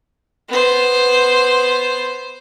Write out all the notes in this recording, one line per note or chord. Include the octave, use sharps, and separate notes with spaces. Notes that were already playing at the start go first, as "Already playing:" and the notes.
B3 C5